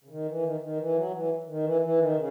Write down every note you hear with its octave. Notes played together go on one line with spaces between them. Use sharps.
C#3
D#3
E3
D#3
D#3
E3
F#3
E3
D#3
E3
E3
D#3
C#3